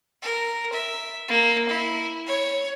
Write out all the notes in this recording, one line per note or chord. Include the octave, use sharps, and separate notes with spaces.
A#4
E5
A#3
E4
C#5